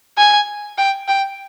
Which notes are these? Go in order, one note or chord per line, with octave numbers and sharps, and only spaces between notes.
G#5
G5
G5